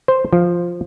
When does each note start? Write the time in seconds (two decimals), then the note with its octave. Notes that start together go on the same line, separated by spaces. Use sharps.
0.08 C5
0.33 F3